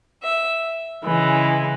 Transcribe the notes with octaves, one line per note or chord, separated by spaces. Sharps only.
E5
C#3 E3 G#3